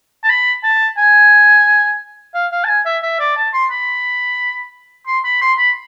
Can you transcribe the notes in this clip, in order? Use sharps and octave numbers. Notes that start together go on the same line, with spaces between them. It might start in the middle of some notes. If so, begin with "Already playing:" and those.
A5
B5
A5
G#5
F5
F5
A5
G#5
E5
E5
D5
A5
C6
B5
C6
B5
C6
B5